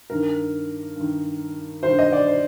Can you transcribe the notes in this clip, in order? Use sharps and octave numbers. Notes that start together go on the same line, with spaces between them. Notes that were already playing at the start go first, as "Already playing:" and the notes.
G2 D#3 A#4
G2 D#3
G2 D#3 C5
D#5
D5
C5